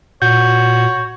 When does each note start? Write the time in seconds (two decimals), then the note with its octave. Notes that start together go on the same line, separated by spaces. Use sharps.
0.22 A#2 F#4 C#5 G6